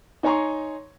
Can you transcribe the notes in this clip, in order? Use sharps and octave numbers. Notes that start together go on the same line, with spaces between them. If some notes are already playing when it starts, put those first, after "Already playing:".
D#4 C#5 G#5 A#5 C6 C#6